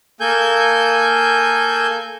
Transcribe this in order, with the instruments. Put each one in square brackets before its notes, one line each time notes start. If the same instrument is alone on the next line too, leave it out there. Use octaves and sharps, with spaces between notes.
[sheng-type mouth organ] A#3 A4 G#5 G6